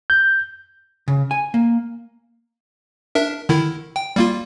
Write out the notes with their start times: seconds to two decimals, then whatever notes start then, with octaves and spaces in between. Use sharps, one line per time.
0.10 G6
1.08 C#3
1.31 G#5
1.54 A#3
3.15 D4 A#4 E5
3.49 D3 D#3 E4
3.96 G5
4.16 G3 A#3 F4